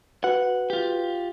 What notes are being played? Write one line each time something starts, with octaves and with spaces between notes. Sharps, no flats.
F#4 B4 F#5
F4 G4